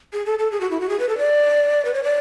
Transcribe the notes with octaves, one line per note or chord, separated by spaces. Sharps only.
G#4
A4
A4
G#4
F#4
E4
F#4
G#4
B4
A4
D5
B4
C#5
D5